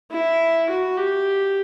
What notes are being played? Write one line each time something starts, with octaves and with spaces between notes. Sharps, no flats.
E4
F#4
G4